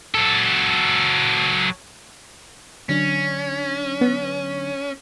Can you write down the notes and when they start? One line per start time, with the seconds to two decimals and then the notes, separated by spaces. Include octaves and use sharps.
0.15 F#3 A4
2.89 D3 F#3 C#4 D4
4.01 B3